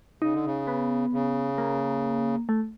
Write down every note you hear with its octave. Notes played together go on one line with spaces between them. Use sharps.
C#3 D#4
D3
C#3
B3
C#3
A#3
A3